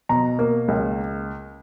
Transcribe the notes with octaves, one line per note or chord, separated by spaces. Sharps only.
B2 A#5
A#3
C#2